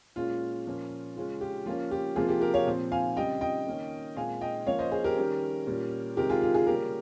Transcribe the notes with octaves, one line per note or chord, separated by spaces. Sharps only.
A#2 G#3 C#4 F4
A#2 F3 A#3 C#4
C#3 G#3 C#4 F4
G4
F3 A#3 C#4 F4
G4
C3 F3 A#3 F4 G#4
G4
G4 A#4
C#5 F5
A#2 F3 C4
F5 G#5
C#3 G3 C4 D#5 G5
D#5 G5
D#3 A#3 C#4
A#2 G#3 C4 F5 G#5
D#5 G5
F3 A#3 C#4 C#5 F5
C5 D#5
G#4 C5
G4 A#4
D#3 G3 C#4
A#2 G3 C#4
C3 D#3 G#3 C4 G4 A#4
F4 G#4
F4
F4 G#4
C#3 G3 A#3 C#4 G4 A#4